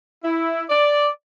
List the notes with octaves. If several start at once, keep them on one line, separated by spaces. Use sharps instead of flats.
E4
D5